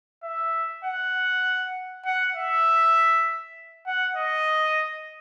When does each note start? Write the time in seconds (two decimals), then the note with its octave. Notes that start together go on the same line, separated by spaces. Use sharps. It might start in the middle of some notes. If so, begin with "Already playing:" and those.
0.23 E5
0.84 F#5
2.05 F#5
2.36 E5
3.86 F#5
4.16 D#5